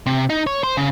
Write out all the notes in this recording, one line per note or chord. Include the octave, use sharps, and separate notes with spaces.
C3
D#4
C#5
C5
C#3